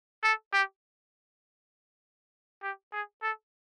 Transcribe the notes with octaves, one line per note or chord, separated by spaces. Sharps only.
A4
G4
G4
G#4
A4